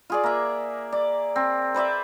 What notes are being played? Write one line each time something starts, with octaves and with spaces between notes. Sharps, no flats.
F4 G#4 D5
A#3 E5
D5
C4
B4 C5 D5 E5